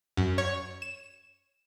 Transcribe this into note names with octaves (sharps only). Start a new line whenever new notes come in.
F#2
C#5
E7